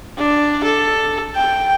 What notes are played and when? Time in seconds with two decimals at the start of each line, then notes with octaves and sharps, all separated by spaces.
0.18 D4
0.64 A4
1.36 G5